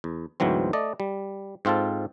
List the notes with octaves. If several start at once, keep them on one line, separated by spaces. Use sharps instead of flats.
E2
D2 G#2 E3 F#3 C4
A3 D5 D#5
G3
G#2 C4 F4 A4 A5